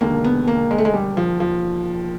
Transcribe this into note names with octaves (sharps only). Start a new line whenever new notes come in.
E1 D#2 D3 A#3
B3
A#3
G#3
A3
G#3
G3
F3
F3